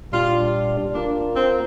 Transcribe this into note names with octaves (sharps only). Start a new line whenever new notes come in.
A#2 G3 D4 F4 G4 D5
A#3 D4 F4 A#4
C4